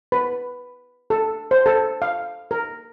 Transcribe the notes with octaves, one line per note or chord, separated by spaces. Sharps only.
B4
A4
C5
A4
F5
A#4